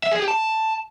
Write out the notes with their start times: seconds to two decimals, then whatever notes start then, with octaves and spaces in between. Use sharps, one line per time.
0.03 E5
0.12 G#4
0.20 G4
0.28 A5